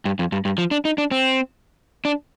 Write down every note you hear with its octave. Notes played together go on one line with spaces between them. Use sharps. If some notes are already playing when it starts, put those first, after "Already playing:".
G2
F2
G2
G2
F3
D4
D#4
D4
C4
D4